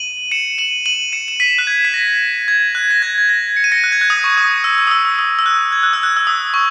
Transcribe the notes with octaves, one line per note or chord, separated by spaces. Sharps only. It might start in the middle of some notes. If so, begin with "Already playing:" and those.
Already playing: D#7 F#7
C#7 E7
D#7 F#7
D#7 F#7
C#7 E7
E7
B6 D#7
F#6
G#6
B6
A#6
G#6
F#6
A#6
G#6
G#6
A#6
C#7
D#7
A#6 C#7
F#6
G#6
F#6
D#6
C#6
D#6
E6
E6
D#6
E6
D#6
E6
E6
F#6
G#6
F#6
E6
F#6
E6
D#6
C#6